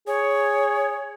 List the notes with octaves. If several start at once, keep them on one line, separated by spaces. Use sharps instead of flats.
G#4 C#5